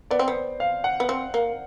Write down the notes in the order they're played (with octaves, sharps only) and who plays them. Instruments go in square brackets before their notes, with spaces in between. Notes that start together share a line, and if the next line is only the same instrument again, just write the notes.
[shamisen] B3 [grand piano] D5
[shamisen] C4
[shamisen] B3 [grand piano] C5
[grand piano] F5
F#5
[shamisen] B3
C4
A#3